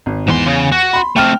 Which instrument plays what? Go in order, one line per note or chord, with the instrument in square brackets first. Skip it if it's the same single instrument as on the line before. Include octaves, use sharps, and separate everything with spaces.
[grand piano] G#1
[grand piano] E2 [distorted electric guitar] G#2 C6
[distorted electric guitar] C#3
F#4
[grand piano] B5 C6
[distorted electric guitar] A3 C4 [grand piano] G5 F6